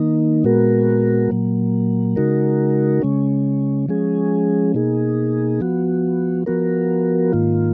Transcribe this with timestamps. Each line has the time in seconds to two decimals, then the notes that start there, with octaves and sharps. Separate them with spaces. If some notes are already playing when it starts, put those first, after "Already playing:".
Already playing: D#3 A#3 D#4
0.44 A#2 G#3 B3 F#4 A#4
1.30 A#2 F#3 A#3
2.16 C#3 G#3 D#4 F#4 A#4
3.02 C#3 G#3 C#4
3.89 F3 G#3 C#4 G#4
4.74 B2 A#3 D#4 G#4
5.60 F3 B3 F#4
6.46 F3 B3 F#4 A#4
7.32 G#2 D#3 A#3 F4